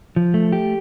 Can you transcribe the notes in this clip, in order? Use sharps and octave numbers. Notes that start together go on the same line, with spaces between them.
F3
A3
G4